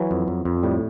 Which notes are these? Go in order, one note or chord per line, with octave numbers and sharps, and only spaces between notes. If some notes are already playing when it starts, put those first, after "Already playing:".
Already playing: E3 F#3
F2
F2
F2
A2 G3